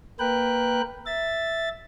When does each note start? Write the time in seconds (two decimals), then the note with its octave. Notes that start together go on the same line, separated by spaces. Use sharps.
0.19 A#3 A#4 B4 G5 F#6
1.06 E5 A6